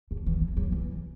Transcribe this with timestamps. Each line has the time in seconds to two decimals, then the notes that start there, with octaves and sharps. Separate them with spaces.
0.11 D3
0.26 E3
0.42 E3
0.57 F#3
0.72 E3